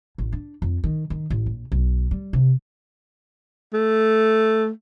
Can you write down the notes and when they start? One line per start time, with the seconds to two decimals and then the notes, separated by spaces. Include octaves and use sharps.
0.18 A1
0.32 D4
0.62 F2
0.84 D#3
1.10 D#3
1.30 A1
1.46 A#1
1.72 B1
2.11 G3
2.33 C3
3.73 A3